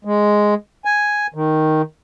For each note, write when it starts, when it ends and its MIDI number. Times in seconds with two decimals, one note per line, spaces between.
0.05 0.54 56
0.85 1.27 80
1.34 1.82 51